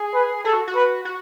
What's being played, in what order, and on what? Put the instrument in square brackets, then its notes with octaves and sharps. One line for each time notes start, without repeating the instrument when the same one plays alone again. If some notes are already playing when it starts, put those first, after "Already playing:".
Already playing: [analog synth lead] G#4
[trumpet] B4
[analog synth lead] G#4 [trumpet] A4
[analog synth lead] F#4
F#4
[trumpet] B4
[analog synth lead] F#4